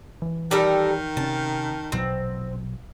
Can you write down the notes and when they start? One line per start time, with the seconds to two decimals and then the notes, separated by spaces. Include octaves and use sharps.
0.22 E3
0.51 D#3 G3 A4 A#4
1.17 C3 C#4 A5
1.92 A#1 B2 F#3 C4